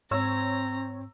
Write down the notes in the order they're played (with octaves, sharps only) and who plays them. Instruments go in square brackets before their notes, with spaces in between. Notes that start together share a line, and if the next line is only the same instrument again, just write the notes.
[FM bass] G#2 [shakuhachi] C4 [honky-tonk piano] C#5 E6 [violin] A#5